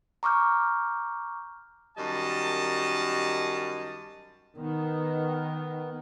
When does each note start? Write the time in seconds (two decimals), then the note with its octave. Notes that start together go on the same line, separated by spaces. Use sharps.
0.23 A#5 C#6 D6 F6 G6
1.98 F#2 D#3 G3 D#5 A5
4.57 D#3 B3